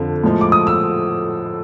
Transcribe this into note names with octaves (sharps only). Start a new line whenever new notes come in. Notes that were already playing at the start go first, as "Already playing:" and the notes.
Already playing: F2 D3 F3
A2 F3 G#3
D6
D#6
E6